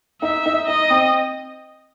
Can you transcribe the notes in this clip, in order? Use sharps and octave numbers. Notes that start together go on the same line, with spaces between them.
D#4 E5
D#4
D#4 D#5
C4